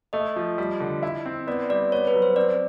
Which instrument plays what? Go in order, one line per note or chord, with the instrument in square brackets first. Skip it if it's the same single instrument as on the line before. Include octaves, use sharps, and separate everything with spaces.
[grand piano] A3 [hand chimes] D#5
[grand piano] F3
G3
D3
E4
C4
[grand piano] B3 [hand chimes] D5
[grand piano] G3 [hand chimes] D5
[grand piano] B3 [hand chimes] C#5
[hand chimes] B4
[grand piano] F#3
[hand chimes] C5
[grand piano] C4 [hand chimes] D5